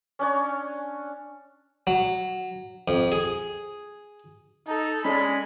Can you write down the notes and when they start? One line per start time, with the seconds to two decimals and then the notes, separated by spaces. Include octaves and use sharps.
0.19 C#4 D4 C#5
1.87 F#3
2.88 F2
3.12 G#4
4.67 D#4 A4
5.05 G#3 C#4 C#5 D5 B5